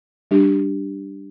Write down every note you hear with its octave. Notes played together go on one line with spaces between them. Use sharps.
G3 D4 G4